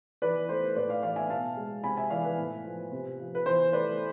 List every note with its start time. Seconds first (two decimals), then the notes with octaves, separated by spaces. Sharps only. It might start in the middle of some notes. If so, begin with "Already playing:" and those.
0.22 E3 B4 D5
0.49 A3 C5
0.76 A2 B4 D5
0.89 D5 F5
1.03 E3 D5 F5
1.16 E5 G#5
1.30 B2 F5 A5
1.57 G#3
1.84 C3 G#5 B5
1.97 E5 G#5
2.10 E3 D5 F5
2.24 B4
2.38 A2
2.64 F3
2.92 C3
3.19 F3
3.35 B4
3.46 E3 C5
3.73 A3 B4 D5